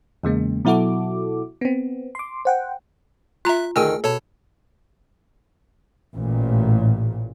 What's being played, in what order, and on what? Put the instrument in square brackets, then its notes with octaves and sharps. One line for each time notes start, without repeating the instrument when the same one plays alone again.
[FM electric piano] E2 C#3 G#3 A#3
B2 F#3 E4 F#4 A4 D6
B3 C4
C6 D6
C5 F#5 G5
[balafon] F4 A#5 [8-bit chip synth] E5 F#6
[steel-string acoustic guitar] D2 D#3 [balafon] G#4 G#5 [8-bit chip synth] G5 E6 F6
[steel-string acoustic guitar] B2 [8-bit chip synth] A4 C#5 A5
[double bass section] A1 A#2